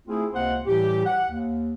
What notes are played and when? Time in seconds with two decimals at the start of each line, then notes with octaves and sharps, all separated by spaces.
0.08 A3 C4 E4 F4 G#4
0.33 C#2 C3 A#3 C4 C5 F#5
0.66 A2 E3 G3 G4
1.06 F#5
1.30 D#2